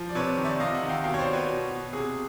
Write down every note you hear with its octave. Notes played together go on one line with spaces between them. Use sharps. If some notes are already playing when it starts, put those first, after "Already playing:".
Already playing: F3
D5
C3 B4 C#5
D#3
D5 E5
C3 D#5 F5
E5 F#5
D#3
F5 G5
B2 F5 G5
C#5
C5 D5
B2
B4 C#5
B2
B2
C3 G#4